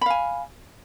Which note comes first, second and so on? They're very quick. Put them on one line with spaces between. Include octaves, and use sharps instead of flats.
B5 F5 G#5